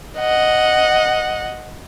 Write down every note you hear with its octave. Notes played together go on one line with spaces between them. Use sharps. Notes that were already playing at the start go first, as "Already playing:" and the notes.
D#5 F#5